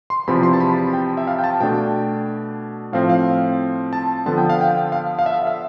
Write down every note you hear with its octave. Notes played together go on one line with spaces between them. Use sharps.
C6
E2 C3 F3 C4 B5
C6
A5
B5
G5
E5
F5
G5
A5
B2 A3 D4 G5
A2 F3 C4 F5
F5
A5
D3 F3 B3 A5
G5
F5
G5
F5
F5
E5
E5